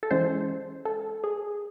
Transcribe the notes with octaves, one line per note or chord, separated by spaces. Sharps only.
A4
E3 G#3 C#4 C5
A4
G#4